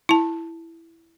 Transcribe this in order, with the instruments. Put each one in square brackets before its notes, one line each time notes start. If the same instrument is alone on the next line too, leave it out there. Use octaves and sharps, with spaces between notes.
[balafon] E4 A5